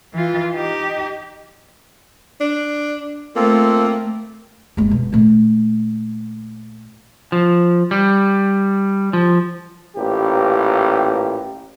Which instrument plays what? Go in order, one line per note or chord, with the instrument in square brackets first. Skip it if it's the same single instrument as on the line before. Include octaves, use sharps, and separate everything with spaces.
[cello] E3 F4
D#4 G4
[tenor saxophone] D4
[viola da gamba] A3 [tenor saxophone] A#3 [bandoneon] C4 F4 A4
[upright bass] F#1 G#3
B2
A#2 A3
[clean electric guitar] F3
G3
F3
[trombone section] A1 A#2 G4